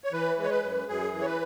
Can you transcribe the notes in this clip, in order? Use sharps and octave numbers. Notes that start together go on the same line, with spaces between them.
C#5
E3 B4
G#3
C#5
B4
F#2
F#2 G#4
E3
C#5
B4